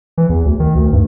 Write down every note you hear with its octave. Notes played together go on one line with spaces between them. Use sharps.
E3
E2
D2
D#3
D2
G2